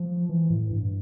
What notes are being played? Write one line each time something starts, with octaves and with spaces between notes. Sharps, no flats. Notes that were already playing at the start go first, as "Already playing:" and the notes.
Already playing: F3
E3
A2
G2